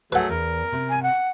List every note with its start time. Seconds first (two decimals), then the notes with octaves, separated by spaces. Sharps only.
0.12 F#3 A3 G#4 B4 F#5
0.29 E2 A#4
0.72 C3
0.90 G#5
1.03 F#5